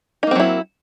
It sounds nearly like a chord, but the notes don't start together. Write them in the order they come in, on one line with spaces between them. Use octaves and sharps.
D#4 A#3 C4 F#3 E4